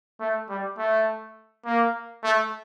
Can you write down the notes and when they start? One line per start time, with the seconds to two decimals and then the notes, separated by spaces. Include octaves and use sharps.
0.20 A3
0.49 G3
0.78 A3
1.65 A#3
2.23 A3